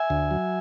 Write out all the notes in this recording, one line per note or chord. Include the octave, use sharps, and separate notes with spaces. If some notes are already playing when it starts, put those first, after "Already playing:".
Already playing: E5 G#5
D2
F#3